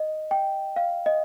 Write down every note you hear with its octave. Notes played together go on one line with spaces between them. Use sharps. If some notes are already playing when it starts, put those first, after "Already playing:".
Already playing: D#5
G5
F5
D#5